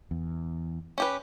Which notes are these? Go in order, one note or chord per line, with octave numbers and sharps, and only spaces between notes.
E2
C#4 G4 B4